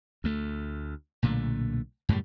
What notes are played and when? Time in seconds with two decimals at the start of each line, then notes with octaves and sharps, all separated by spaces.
0.24 D2 A3
1.23 B1 A#2 D3 A3
2.09 F#2 A2 C#3 G3